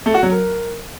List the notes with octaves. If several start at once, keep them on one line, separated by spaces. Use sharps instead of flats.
A3
F#4
F#3
A#4